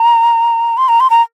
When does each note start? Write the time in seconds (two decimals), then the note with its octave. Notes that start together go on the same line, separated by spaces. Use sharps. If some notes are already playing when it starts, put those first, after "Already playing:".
Already playing: A#5
0.77 C6
0.89 A#5
1.00 C6
1.10 A#5